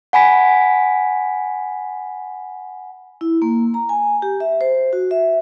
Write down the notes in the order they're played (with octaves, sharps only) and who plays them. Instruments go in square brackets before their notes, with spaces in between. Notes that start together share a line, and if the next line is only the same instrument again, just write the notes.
[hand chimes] F#5 G#5 B5 B6
[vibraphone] E4
A#3
A#5
G#5
G4
E5
C5
F#4
E5